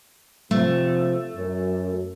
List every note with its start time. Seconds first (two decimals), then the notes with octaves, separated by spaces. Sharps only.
0.51 C3 F3 A3
1.37 F#2